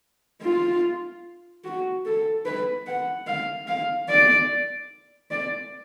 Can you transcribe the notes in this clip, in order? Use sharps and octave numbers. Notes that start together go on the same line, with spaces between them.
F4
F#4
A4
B4
F#5
F5
F5
D5
D5